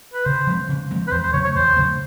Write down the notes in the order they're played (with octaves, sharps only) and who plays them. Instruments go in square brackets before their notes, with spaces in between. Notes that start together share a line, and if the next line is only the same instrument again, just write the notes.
[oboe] B4
[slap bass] C#3 [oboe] C5
[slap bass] F3 G#3 C4
C#3
F3 G#3 C4
[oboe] B4
[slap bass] E2 [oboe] C5
[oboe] C5
[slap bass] C#3 F#3 A3 [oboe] C#5
[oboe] C#5
[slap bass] E2 [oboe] C5
[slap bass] C#3 F#3 A3